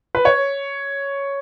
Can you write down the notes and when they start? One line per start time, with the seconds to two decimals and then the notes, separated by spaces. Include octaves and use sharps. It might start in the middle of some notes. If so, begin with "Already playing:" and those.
0.15 B4
0.25 C#5